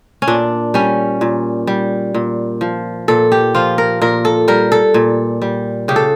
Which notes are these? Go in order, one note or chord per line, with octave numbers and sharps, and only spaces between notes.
C#4
A#2 D4
G3 C#4
A#2
G3
A#2
F3
A#2 A4
G4
F3 F4
A#4
A#2 A#4
A4
G3 A#4
A4
A#2
G3
C#3 G4
A4